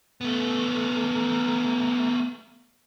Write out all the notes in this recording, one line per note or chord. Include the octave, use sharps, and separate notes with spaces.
A3 B3